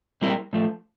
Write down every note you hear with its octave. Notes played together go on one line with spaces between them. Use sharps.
A#2 G3 C4 E4 A#4
A2 F3 A3